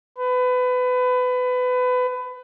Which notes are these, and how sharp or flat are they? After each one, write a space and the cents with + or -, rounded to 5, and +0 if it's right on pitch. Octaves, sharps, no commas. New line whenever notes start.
B4 +25